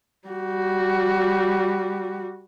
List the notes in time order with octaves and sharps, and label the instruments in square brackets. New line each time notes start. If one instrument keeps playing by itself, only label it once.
[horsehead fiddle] G3 F#4